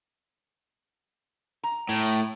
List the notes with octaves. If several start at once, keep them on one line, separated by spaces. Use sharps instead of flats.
A#5
A2